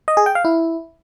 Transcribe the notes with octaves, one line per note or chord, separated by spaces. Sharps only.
D#5
G#4
G5
F5
E4